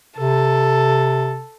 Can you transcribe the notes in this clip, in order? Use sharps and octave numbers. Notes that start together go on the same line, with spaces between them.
C3 A4